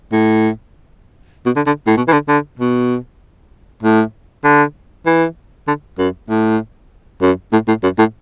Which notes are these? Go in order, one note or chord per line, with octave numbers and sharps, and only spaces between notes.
A2
B2
D3
D3
A2
B2
E3
D3
D3
B2
A2
D3
E3
D3
F#2
A2
F#2
A2
A2
F#2
A2